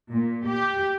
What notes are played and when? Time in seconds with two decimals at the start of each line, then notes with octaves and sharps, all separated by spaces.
0.13 A#2
0.47 G4